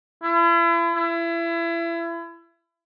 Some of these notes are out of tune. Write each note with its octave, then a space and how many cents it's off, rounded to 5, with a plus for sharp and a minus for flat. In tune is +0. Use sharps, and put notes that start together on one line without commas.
E4 +40
E4 +30